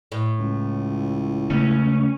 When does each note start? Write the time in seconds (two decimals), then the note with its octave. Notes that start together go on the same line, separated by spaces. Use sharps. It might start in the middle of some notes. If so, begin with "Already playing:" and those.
0.12 A2
0.39 C#2
1.50 C#3 A3 C#4